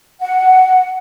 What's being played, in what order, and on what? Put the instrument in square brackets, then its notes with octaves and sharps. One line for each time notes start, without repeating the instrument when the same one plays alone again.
[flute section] F#5